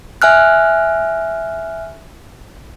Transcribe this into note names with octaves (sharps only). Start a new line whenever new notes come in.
E5 G#5 F6 F#6